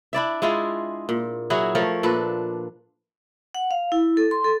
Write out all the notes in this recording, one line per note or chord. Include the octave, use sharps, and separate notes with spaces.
D4 E4 D5 E5
G#3 E4 F4 G#4
A#2
F#3 E4 F#4 G#4
F3 A3 A#4 C#5
A#2 D4 A4 B4
F#5
F5
E4
A4
C6
A4